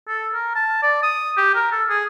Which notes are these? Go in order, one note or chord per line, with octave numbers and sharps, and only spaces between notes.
A4
A#4
A5
D5
D#6
G4
A#4
A4
G#4